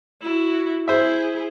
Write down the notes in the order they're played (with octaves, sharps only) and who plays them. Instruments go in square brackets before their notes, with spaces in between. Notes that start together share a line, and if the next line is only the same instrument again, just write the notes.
[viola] E4 F#4
[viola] E4 G#4 [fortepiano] C5 E5